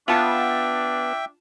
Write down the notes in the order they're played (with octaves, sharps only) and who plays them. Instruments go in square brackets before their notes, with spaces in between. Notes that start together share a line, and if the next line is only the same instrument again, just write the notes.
[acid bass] B3 [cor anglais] D4 [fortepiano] F4 A5 [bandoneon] E5 G5